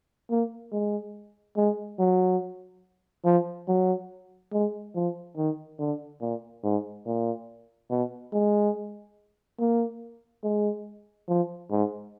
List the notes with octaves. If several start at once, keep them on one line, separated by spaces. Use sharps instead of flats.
A#3
G#3
G#3
F#3
F3
F#3
G#3
F3
D#3
D3
A#2
G#2
A#2
B2
G#3
A#3
G#3
F3
G#2